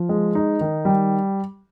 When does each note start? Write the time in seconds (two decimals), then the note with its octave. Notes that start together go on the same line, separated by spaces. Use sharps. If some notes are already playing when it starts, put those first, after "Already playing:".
Already playing: F3
0.09 G#3
0.35 D#4
0.61 D#3
0.85 G3